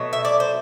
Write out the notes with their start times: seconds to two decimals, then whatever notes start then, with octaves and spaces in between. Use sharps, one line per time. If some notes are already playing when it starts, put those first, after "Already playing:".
Already playing: B2 F#3 A3
0.13 E5
0.25 D5
0.40 C5